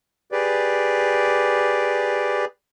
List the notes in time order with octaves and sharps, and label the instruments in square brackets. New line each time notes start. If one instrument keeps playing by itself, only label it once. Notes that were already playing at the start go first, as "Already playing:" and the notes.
[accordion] G4 G#4 B4 D5